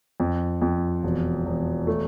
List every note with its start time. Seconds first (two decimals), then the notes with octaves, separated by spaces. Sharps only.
0.20 F2
0.62 F2
1.03 E1
1.46 E1
1.87 A3